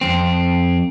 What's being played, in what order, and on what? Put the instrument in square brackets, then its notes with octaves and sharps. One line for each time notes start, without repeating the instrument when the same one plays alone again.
[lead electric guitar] F2 C4